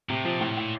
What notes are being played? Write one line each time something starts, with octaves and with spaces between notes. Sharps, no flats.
A2 C3
A#2 F3
A2
A2